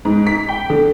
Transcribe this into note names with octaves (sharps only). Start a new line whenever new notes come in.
G#2
B6
G5
D3